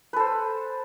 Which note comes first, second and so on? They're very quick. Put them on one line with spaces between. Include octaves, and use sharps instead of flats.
B4 A4 C5